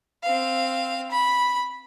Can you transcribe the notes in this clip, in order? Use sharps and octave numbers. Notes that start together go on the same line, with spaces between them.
C4 F5
B5